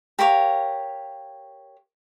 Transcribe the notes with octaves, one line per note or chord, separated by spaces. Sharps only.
G4 A#4 C#5 F5